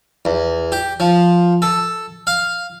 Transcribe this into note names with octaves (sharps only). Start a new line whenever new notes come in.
E2
G4
F3
A4
F5